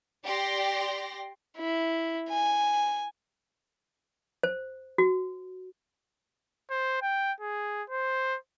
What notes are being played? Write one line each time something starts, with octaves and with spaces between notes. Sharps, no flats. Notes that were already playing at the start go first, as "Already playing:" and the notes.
G4 D5 G5 C6 A#6
E4
G#5
C5
F#4
C5
G5
G#4
C5